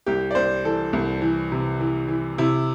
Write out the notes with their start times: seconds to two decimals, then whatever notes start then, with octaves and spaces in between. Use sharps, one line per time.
0.06 C2 G4
0.31 D5
0.35 C2 C5
0.65 E3 A4
0.93 C2
1.22 E3
1.52 C3
1.80 E3
2.08 E3
2.38 C3 E4